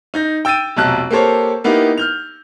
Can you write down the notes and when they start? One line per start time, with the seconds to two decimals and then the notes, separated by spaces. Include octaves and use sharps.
0.14 D#4 G6 A#6
0.45 G5 E6 A6 D7 D#7
0.77 F1 B1 A5 F#6
1.11 A#3 G4 A4 C5 C#5
1.64 A#3 B3 D#4 E4 G4
1.98 F6 G6 F7